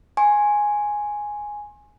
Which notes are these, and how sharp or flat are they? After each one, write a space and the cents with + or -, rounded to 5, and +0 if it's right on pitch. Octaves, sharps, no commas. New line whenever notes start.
G#5 +0 C6 +40